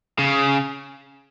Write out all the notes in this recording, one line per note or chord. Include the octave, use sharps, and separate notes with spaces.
C#3